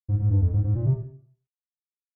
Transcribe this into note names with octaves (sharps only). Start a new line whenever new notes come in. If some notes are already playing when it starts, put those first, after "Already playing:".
G#2
G#2
G2
F2
G#2
G#2
A#2
C3